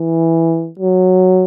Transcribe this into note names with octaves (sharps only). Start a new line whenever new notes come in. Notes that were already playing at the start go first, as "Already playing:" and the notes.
Already playing: E3
F#3